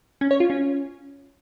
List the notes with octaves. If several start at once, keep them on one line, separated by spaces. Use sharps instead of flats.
C#4
C#5
F4
C#4